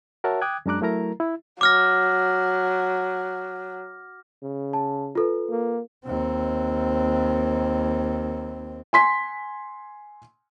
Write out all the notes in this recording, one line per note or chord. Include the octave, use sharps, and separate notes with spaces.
F#4 A#4 C#5 E5 F#5 A5
G5 D6 D#6 F#6 G#6
F#2 G#3 D4 A#5 D6 F#6
F#3 A3 E4 A#4 A#5
E4
F#3 D6 F6 A#6
C#3
A5
F4 A4 B4
A#3
D#2 C4
G#5 C6 B6